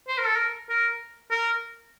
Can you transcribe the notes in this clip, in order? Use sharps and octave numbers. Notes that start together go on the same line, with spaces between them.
C5
A#4
A4
A#4
A#4
A#4